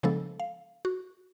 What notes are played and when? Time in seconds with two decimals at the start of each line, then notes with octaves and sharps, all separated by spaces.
0.03 C#3 F3 G#3 B3 D4 A4
0.40 F5
0.85 F#4